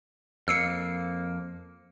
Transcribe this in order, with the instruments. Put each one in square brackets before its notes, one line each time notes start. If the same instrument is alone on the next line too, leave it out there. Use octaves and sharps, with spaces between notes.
[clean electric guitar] F2 A#3 [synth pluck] E6 C7 C#7